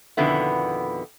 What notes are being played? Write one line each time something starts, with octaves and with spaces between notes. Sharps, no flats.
F2 B2 D3 D#3 B3 E4